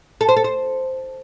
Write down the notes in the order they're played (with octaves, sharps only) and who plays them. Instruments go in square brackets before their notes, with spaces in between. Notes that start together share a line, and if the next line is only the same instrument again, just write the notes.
[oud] A4
C5
A4
C5